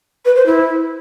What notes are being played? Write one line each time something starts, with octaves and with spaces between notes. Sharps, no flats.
B4
C5
E4